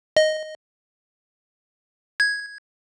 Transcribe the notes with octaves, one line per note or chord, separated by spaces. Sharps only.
D#5
G#6